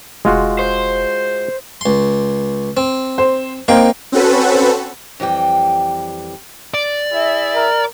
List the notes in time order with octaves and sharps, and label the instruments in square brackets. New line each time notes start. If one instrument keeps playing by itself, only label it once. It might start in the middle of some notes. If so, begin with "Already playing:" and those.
[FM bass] F1 [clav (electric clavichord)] G#3 F4 F#4
[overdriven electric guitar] C5
[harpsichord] C#2 C6
C4
[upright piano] C5
[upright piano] A#3 C4 [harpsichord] D#4 G5
[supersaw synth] C4 C#4 F#4 A4 B4
[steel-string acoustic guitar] F2 E3 G3 G5
[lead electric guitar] D5
[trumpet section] E4 G#4 E5
[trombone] A#4